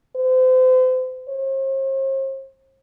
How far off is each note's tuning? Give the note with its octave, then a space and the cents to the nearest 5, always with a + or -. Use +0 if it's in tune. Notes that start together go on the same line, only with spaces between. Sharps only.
C5 -35
C5 +45